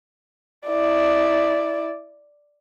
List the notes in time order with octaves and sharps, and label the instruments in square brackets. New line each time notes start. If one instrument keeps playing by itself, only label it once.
[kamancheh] E4 D5